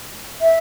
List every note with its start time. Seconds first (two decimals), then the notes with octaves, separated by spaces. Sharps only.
0.42 E5